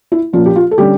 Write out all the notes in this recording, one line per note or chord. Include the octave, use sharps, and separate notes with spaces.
E4
A#2 F3 A#3 C#4 F4
G4
F4
A4
D3 G3 C#4 G4